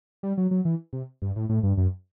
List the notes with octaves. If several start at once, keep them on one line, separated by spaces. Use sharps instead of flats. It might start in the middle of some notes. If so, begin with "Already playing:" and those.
G3
F#3
F#3
E3
C3
G2
A2
A2
G2
F#2